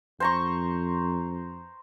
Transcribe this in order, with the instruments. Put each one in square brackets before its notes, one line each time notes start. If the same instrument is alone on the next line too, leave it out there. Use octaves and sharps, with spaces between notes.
[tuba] F2 [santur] C5 A#5 C#6